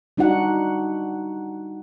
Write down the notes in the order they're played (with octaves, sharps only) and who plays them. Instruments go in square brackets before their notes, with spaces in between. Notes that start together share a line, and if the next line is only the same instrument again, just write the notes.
[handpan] G3 D4 D#4 F#4 F#5